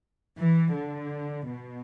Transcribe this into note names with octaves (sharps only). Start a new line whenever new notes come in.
E3
D3
B2